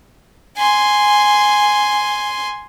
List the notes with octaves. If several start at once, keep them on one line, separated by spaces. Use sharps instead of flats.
G#5 C6